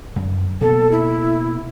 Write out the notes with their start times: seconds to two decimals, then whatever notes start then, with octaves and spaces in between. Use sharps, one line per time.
0.16 F#2
0.61 B2 A#3 A4
0.91 E4